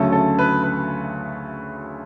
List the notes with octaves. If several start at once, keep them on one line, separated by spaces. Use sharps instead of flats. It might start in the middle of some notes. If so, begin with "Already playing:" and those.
Already playing: D2 C#3 F#3 A3 A4
A4
B4
B4